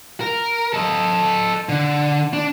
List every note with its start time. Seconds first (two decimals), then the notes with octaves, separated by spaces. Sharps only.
0.20 A#4
0.74 A4 D#5
1.69 D3
2.33 D4